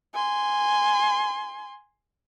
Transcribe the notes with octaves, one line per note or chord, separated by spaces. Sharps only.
G#5 C6